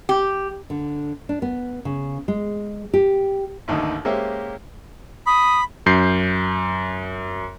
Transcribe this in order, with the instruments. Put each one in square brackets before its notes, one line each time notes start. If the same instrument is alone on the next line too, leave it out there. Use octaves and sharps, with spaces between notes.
[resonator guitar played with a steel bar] G4
[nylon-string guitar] D3
D4
B3
C#3
G#3
G4
[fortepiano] A1 D#2 D3 D#3 D#4
G#3 A#3 C#4 G4 C5 E5
[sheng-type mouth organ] B5 [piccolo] D#6
[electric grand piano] F#2 G6 C7